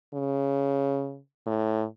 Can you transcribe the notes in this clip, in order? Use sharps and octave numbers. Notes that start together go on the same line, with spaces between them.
C#3
A2